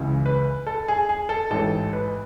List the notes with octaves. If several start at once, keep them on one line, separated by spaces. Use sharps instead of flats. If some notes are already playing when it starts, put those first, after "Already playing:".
Already playing: C#2 C#3 E3
B4
A4
G#4
G#4
A4
A1 G#2 E3 A4
B4